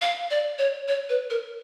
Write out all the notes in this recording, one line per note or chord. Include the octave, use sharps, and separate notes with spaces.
F5
D5
C#5
C#5
B4
A#4